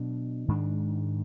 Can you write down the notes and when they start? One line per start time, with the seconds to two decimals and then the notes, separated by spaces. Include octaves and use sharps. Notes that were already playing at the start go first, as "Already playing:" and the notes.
Already playing: B2 F#3 D4
0.48 G#2 D#3 G#3 D4